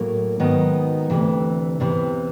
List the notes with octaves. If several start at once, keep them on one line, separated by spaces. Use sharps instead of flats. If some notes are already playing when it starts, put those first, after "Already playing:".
Already playing: A2 F#3 A#3
G#2 D#3 F#3 B3 D#4
D2 C3 E3
E2 C3 E3